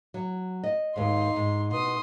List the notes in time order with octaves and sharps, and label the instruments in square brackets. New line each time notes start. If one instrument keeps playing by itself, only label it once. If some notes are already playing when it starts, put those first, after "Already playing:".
[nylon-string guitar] F#3
D#5
[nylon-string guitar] D#2 G#2 [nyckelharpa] D#4 C6
[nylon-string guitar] G#2
[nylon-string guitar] B2 [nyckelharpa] C6 D#6